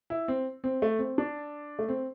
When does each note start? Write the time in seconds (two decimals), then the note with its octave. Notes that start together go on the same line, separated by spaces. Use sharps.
0.10 E4
0.28 C4
0.64 C4
0.82 A3
0.99 C4
1.18 D4
1.79 A3
1.89 C4